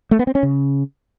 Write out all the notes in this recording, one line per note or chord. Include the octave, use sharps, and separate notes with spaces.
A3
B3
C4
C#4
C#3